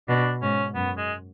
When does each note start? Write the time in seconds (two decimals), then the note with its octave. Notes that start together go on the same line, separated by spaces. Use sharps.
0.08 B2 D4
0.42 G#2 C#4
0.75 F#2 B3
0.97 G#3